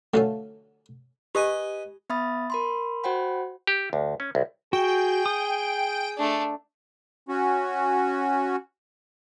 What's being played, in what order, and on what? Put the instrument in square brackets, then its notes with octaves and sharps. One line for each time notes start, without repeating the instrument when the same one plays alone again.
[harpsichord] D3 F#3 C#4 [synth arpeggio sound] A3 F5 A5
[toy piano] G4 [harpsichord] B4 D#5 G#5
[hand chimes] B3 E5 B5 D#6 A6
A#4 B5 C6
F#4 C5 F#5 G5 B5
[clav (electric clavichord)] G4
D2
C#4
C2
[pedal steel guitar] F#4 [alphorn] G#4 [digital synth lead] G5
[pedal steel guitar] D#6
[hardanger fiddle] A3 D4
[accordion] C#4 F#4